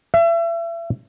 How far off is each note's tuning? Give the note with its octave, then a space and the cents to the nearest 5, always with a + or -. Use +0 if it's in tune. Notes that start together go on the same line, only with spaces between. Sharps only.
E5 +35